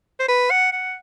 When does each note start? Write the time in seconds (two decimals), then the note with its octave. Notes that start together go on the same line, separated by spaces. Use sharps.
0.20 C5
0.28 B4
0.50 F#5
0.72 F#5